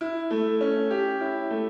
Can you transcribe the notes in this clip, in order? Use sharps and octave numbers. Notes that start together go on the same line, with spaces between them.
E4
A3
C#4
G4
E4
A3